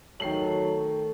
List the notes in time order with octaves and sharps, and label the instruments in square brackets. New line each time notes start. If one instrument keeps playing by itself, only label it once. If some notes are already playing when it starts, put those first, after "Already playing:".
[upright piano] D#3 C7 F#7 [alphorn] F#3 [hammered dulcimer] A3 A4